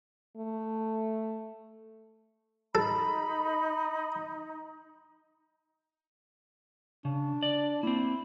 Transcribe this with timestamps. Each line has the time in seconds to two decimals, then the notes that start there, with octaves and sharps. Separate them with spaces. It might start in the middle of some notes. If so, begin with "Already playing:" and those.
0.37 A3
2.75 D#4 A4 B5
7.05 C#3 D4
7.43 D5
7.83 A#3 C4 E4